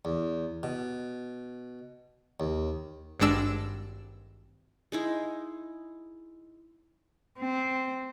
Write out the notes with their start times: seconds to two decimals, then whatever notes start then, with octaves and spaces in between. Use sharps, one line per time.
0.05 E2
0.63 B2
2.40 D#2
3.20 G#1 G2 G#3 D4 E6
4.92 G#3 D#4 E4
7.39 C4